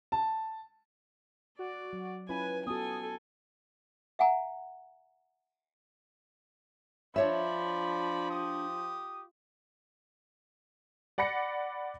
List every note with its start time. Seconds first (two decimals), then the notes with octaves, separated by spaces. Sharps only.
0.12 A5
1.59 F#4 D5
1.93 F#3
2.29 C#4 E4 F4 B4 G#5
2.67 B3 F#4 A4 G#5 D#6
4.19 E5 F#5 G#5 A#5
7.16 F3 D4 C#5 D5 E5 B5
8.31 G4 D#6
11.18 D5 F#5 B5 A#6 C#7